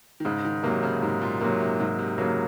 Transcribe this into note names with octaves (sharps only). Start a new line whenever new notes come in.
D#3
G#2 C#3
D#3
C3 F#3 A#3
C#3
G#2 C3
A#2
C3 F#3 A#3
C3
G#2 C3
C3
C#3 F#3 A#3